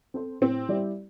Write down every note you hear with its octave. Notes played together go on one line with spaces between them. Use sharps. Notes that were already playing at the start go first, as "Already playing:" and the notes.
C4 A4 C5
A2 C4
G3 E4 G4 D5